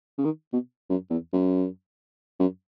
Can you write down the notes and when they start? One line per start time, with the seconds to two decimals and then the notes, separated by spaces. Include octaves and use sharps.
0.18 C#3
0.25 D#3
0.53 B2
0.89 F#2
1.10 E2
1.33 F#2
2.40 F#2